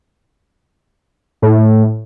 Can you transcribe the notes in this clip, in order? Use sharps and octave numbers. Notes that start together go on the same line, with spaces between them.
A2